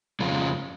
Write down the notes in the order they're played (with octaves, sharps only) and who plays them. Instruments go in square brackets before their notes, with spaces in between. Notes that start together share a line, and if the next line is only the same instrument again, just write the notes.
[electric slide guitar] F2 C#3 G#3 C#4 F4